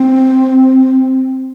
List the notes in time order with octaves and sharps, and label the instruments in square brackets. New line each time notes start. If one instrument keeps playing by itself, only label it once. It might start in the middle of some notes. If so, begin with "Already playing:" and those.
Already playing: [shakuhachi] C4